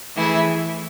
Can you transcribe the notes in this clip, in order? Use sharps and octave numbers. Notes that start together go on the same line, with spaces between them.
E3 A3 E4 G#4